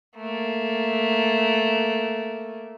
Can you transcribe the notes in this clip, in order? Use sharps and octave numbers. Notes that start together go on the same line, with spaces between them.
A3 A#3